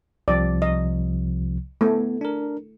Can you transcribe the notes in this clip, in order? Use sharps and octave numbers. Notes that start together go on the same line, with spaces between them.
C2 C3 F3 D5
D#5
A3 B3
D4 A#4